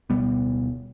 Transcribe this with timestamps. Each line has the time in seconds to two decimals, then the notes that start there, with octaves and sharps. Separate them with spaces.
0.10 D1 B2 G3 B3